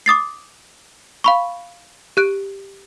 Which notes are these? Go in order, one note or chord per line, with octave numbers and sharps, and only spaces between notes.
D6 D#6 A6 C7
F5 B5 C#6
G4 F#6 D7